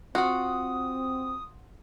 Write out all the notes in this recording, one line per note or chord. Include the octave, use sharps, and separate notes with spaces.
C4 F4 F#4 F#5 D#6